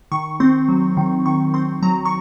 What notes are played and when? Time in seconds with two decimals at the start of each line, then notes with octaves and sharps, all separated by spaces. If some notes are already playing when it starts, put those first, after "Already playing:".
0.12 D#3 C#6
0.40 C4 C6
0.68 F#3
0.97 D#3
1.26 D#3 C#6
1.54 C4 C6
1.82 F#3 A#5
2.05 C#6